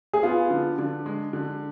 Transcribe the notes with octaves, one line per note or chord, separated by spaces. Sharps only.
G#4
B3 F4
D3
D3
G#3
D3